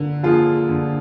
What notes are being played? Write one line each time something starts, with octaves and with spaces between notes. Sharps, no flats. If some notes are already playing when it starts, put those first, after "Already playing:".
Already playing: D3 A#3
F3 A#3 F4 G#4
D3